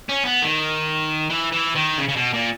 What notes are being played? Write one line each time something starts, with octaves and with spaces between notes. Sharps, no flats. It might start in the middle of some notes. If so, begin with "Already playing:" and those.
C#4
B3
D#3
E3
E3
D#3
C#3
C#3
B2
A#2